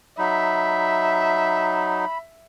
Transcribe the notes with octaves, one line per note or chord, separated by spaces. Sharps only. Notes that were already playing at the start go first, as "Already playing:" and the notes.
F#3 D#4 E5 B5